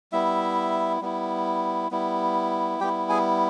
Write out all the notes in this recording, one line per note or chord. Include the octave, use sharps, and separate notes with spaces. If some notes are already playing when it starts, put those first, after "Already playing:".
G3 B3 E4 E5
G3 B3 E4
G3 B3 E4
G3 B3 E4 G4 G5
G#4 G#5